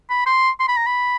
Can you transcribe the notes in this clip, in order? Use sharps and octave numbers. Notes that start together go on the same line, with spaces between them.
B5
C6
C6
B5
A#5
B5